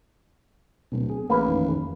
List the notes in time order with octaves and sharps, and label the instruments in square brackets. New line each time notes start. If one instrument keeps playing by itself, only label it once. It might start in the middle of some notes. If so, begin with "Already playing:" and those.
[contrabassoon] D1 [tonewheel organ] B2
[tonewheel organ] G#4
[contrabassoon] A1 [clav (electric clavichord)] A#3 B4
[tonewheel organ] F2 D#3